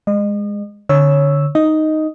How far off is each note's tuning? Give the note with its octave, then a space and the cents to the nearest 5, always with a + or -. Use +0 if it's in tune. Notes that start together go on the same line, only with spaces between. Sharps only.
G#3 -10 D#5 -35
D3 +0 C#5 +0 E6 +0
D#4 +0 D#5 +5